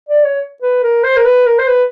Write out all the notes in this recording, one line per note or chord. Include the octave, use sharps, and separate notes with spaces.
D5
C#5
B4
A#4
C5
A#4
B4
A#4
C5
B4